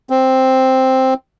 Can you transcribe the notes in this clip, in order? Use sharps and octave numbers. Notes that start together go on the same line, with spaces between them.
C4